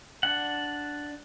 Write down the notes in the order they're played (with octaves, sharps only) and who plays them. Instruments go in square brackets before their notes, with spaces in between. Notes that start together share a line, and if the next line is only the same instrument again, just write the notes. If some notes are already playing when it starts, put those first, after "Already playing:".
[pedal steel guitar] D4 F#5